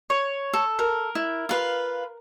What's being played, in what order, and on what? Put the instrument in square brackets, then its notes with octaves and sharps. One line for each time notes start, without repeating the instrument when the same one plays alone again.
[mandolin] C#5
[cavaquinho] A4
[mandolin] A#4
[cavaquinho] E4
F4 B4 F5